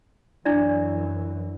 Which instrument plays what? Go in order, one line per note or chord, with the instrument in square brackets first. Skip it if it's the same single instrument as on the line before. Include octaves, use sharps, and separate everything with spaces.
[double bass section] F#2 E3 [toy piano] D4 E4 D5